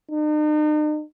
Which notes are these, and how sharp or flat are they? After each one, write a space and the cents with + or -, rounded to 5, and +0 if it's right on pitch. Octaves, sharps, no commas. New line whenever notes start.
D#4 -45